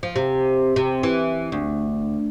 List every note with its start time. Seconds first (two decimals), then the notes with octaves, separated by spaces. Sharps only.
0.03 F3
0.16 C3
0.76 C3
1.03 E3
1.52 D2